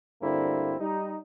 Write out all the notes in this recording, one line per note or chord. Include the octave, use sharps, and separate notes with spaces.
D2 G2 D3 A#3 C4 E4
G3 D#4